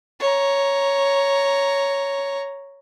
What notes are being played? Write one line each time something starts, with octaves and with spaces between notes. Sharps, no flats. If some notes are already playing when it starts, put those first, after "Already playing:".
C#5 A#5